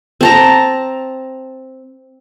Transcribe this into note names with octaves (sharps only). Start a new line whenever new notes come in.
C4 A5 A#5